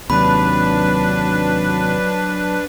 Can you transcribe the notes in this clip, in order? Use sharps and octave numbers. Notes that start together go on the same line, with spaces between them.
D#2 C3 F#3 D4 B4 B5